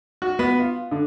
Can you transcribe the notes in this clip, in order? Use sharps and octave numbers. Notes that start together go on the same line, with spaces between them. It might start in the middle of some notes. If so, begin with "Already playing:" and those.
F#4
B3
F4
D3